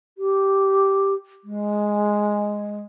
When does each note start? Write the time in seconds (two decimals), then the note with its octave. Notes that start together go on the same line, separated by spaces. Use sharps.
0.18 G4
1.44 G#3